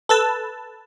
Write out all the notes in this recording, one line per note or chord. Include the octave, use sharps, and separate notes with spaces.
A4 B4 A5